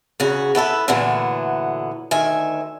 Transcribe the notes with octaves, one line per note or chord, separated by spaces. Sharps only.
E2 C#3 F#4
B3 E4 A4 B4
A#2 D3 E3 F#3 A3 B3
D2 D#3 E5 G#5